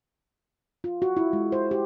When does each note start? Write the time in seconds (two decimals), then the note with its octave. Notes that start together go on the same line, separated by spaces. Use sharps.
0.84 F4
1.02 F#4
1.17 E4
1.33 G#3
1.52 C5
1.71 G4